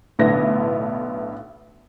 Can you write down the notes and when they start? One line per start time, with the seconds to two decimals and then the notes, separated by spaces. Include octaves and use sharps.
0.19 B1 A2 D3 B3 E4 A#6